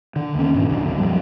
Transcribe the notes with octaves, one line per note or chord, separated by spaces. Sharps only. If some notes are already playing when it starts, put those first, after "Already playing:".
D3
D#2 C#4
G2 A#2 E3
A1 D2 D3
C2 F#2
B1 F#2 F3 G3